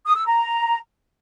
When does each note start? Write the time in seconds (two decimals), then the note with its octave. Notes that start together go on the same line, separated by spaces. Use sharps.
0.06 D#6
0.16 E6
0.26 A#5